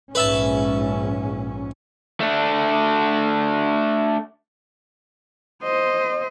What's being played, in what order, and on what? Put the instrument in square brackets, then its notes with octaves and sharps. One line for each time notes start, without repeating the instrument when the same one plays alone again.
[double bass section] A#1 G#2 C#4 [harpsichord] B4 E5 A5
[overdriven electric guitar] A3 D4
[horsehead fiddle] C5 D#5